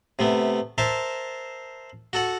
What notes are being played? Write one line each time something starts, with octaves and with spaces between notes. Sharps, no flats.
C3 A3 B3
A#4 C5 E5 A5
F#4 A4 F#5